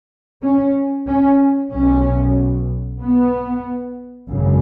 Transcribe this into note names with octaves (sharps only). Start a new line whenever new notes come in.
C#4
C#4
B1 B2 C#4
B3
G#1 F#2 C#3